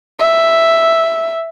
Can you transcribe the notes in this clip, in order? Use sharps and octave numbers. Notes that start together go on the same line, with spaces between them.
E5